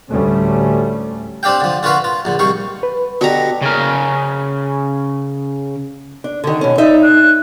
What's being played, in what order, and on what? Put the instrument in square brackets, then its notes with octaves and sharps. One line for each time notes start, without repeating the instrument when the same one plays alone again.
[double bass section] D2 A2 G3 A3 C#4
[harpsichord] C4 D4 G4 F5 G5
D3 F3
D3 F4 F#4 A#4 B4 F5
F4
A#1 D3
C2 D#3 F5 C#6
[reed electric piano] B4
[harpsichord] B2 D3 G4 [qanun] F#4 A#5
[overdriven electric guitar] C#3 A#4
[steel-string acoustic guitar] D4
D3 D#3
B2 C#4
[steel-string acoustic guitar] D#4 E5 [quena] D5
[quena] F#6